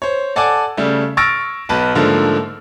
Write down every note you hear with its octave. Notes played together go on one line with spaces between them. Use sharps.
C5 C#5
A4 D5 F#5 G#5 A5 D6
C#3 G3 A3
C#6 E6 F6 A6 A#6 D7
B1 B4 A5
G#2 D3 F3 A3 A#3